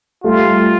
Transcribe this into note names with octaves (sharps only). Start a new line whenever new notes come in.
G3 A3 F4